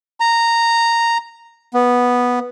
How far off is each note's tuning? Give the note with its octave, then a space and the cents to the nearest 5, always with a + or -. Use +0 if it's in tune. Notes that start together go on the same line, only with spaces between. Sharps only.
A#5 -10
B3 -5